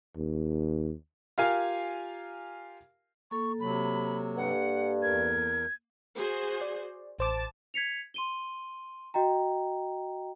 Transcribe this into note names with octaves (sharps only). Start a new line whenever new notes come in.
D#2
F4 G4 A#4 F5 G#5
A#3 A4 C#6
C3 F#3 B5
G2 F#5
E2 A#4 G#6
F#4 G#4 C5
D5
A1 C5 A5 D6
G#6 B6 C#7 F7
C6 D#7 G7
F#4 D#5 G5 A#5